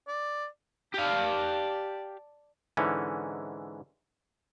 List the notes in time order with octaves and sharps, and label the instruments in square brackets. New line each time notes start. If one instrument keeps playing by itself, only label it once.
[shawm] D5
[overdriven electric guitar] G4 F5 [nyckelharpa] D5 A5
[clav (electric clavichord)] G#2 D3 E3 C#4